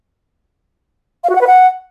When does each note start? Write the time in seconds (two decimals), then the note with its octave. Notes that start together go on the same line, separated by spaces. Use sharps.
1.24 F5
1.29 F#4
1.35 F#5
1.41 B4
1.47 F#5